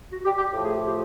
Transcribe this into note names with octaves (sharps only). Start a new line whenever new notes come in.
F#4
G4
G4
A2 F3 A3
G#4
G4
G4